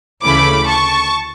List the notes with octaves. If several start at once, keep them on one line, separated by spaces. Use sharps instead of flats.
D2 C#3 E3 A3 C#4 B5 D6
A5 C#6